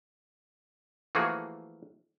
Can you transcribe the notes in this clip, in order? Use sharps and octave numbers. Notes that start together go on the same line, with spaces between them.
E3 F3 A3 A#3 F#4 G#4